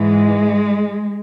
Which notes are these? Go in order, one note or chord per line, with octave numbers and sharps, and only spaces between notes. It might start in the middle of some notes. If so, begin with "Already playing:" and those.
Already playing: G#2 E3 G#3